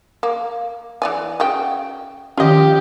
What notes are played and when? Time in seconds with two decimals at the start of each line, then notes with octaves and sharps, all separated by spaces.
0.23 A#3
1.02 E3 D5 G#5
1.40 C#3 F#4 G5
2.37 D#3 F3 C#4 F4 G4 D#5